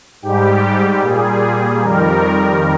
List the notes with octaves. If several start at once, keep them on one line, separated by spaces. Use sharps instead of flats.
G#2 G3 G4
A#2 G3 G#4
F2 D#3 G3 A#4